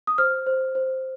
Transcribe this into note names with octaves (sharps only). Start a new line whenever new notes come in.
D#6
C5 F6
C5
C5